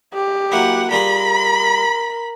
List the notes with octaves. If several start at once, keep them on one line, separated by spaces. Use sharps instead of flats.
G4
F#3 A#3 E4 F#5
G3 F4 G#4 A#4 B5